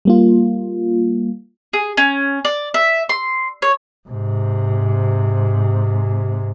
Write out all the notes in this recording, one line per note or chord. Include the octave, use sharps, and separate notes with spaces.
G3 A#3 F4
G#4
C#4
D5
E5
C6
C#5
G#2 C3